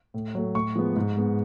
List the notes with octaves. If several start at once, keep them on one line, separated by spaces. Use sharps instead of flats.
A2
F#3 A3
A2 C#6
F3 G#3 B3
G#2
G#3 B3